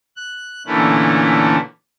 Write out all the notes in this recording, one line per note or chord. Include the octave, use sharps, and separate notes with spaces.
F#6
A#2 D3 E3 A3 C#4 E4